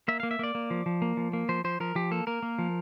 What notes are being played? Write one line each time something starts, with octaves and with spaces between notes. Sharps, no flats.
A#3 E5
A#3 F5
E5
A#3 D5
A#3
F3
F3
A#3
F3
A#3
F3 C5
F3 C5
F3 A#4
F3 G4
A#3 A4
A#3 A#4
A#3
F3